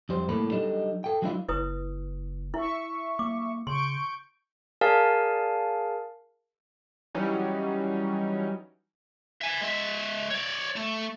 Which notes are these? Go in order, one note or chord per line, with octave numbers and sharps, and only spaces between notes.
F2 G3 C5
C2 A2 A#3 A4 B5
F#3 G3 D4 D#4 A4 D#5
A4 G5
F#3 G#3 B3 D4 E4 F4
F#1 E4 B4 D#6
E4 E5 C#6
A#3 D6
C#3 C6 C#6 G6 D7
G#4 A#4 D5 F5 G#5 A5
E3 F#3 G3 C#4 D#4
E5 G#5
G#3 E5
C#5 D5
A3